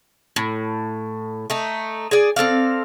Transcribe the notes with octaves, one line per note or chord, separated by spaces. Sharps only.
A2
A3 D#4
G#4 D5
C4 A4 D5 F5